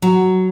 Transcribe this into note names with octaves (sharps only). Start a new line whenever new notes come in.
F#3